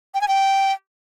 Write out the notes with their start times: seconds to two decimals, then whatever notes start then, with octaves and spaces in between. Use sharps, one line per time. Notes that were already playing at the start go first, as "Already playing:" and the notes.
0.14 G5
0.21 G#5
0.28 G5